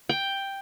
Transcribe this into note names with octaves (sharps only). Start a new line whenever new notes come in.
G5